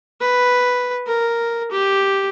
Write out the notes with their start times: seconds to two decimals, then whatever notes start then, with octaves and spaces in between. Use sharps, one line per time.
0.21 B4
1.07 A#4
1.71 G4